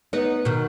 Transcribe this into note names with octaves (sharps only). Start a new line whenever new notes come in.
B3 D#4
B2 D#3